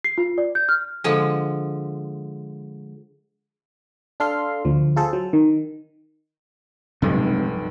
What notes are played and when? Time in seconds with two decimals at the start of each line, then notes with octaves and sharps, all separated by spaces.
0.04 C7
0.18 F4
0.38 D5
0.55 G6
0.69 F6
1.04 D3 F3 G#3
4.20 D4 A4 F5 C6
4.65 D2 F3
4.96 F4 G#4 A4 C5
5.13 F#3
5.33 D#3
7.02 F1 B1 G2 C3 F#3 G#3